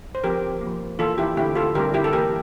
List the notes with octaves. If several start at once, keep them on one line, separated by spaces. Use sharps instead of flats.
C5
F3 C4 G4 A#4
A#3
F3
E3 A#3 F4 A4
E4 G4
D3 A3 C4 E4 G4
F4 A4
D3 G3 C4 G4 A#4
E4 G4
A4
E3 A#3 G4 A#4